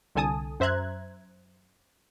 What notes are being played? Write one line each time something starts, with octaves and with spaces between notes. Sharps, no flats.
C2 D3 A4 G#5 A5 D#6
F#2 C5 E5 A#5 F#6 G#6